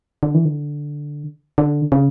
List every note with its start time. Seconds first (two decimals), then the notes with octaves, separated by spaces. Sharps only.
0.23 D3
0.34 E3
0.45 D3
1.58 D3
1.92 C#3